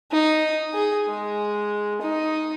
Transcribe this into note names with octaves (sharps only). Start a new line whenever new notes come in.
D#4
G#4
G#3
D#4